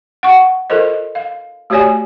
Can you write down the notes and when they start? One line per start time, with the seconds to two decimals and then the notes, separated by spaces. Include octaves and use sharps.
0.23 F#5 C#6
0.70 F4 A4 A#4 C5 D#5
1.15 F5
1.70 A3 F#4 G4 C#5 D5 G#5